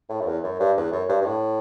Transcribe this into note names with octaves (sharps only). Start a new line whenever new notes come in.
A2
F#2
E2
F#2
G2
E2
F#2
G2
G2
A2